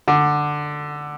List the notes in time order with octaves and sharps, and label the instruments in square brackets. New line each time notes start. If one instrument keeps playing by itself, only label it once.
[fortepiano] D3